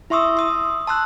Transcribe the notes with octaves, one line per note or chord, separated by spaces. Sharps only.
E4 E5 C6 C#6 D#6 E6
C6 D#6 E6
A5 C6 E6 F#6